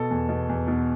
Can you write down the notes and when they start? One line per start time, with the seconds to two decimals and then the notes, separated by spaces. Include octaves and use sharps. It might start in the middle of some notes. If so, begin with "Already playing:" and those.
Already playing: B2 A4
0.11 E2
0.29 B2
0.49 E2
0.67 B2